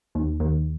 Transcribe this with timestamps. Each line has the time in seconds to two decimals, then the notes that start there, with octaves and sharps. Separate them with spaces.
0.15 D#2
0.40 D#2